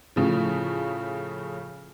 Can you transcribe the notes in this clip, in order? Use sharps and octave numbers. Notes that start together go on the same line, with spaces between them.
A2 C#3 F3